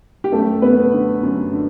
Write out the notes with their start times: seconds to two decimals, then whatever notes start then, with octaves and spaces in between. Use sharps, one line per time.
0.24 G4
0.32 F#2 A3 A4
0.62 F#2 B3 B4
0.92 D3
1.23 F#2
1.53 D3